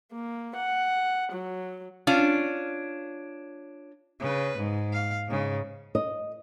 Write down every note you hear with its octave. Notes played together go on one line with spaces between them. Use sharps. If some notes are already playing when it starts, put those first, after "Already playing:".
A#3
F#5
F#3
C#4 D4 F4
C#3 B4
G#2
F5
G#2 C#3
D#5